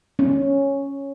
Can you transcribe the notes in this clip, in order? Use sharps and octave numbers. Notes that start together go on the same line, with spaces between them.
C#4